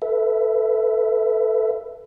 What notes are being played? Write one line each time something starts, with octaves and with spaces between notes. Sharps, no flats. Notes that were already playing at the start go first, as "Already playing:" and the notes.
A4 B4 E5